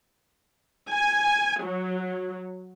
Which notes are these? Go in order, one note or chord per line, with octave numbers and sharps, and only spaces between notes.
G#5
F#3